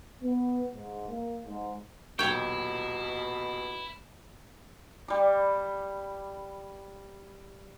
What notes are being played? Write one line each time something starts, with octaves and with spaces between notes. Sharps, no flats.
B3
G#2
A#3
G#2
D#1 B1 B2 E4 C#5 G5 C#6
G3 D6